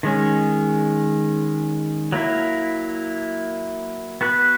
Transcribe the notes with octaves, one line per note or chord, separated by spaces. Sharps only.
D#3 G#3 C#4
F#3 A#3 E4
B3 F#4 B4